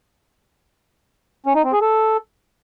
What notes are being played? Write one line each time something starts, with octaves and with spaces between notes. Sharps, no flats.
C#4
D#4
C4
G#4
A4